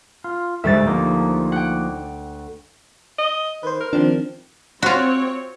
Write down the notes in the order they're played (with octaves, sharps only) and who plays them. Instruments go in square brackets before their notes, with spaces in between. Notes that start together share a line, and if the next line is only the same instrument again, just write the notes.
[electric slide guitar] F4
[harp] D2 G3 A6 [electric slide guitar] G#2 E5
[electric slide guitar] F3 A#3 D#4
[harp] F#5 G5
[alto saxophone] D#5
[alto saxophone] D#3 [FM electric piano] B4 C5
[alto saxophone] A#4
[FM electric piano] D#3 F3 C4 [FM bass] D4
[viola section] C4 C#5 [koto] F4 F#4